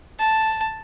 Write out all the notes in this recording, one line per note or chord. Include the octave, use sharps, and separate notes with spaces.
A5